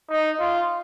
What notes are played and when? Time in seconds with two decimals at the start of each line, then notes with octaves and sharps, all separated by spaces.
0.10 D#4
0.40 F4